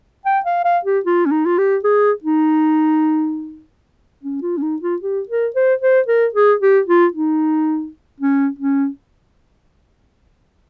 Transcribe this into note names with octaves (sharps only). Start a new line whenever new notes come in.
G5
F5
F5
G4
F4
C#4
D#4
F4
G4
G#4
D#4
C#4
F4
C#4
D#4
F4
G4
A#4
C5
C5
A#4
G#4
G4
F4
D#4
C#4
C#4